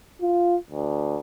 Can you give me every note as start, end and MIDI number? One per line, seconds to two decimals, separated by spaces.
0.21 0.56 65
0.70 1.20 38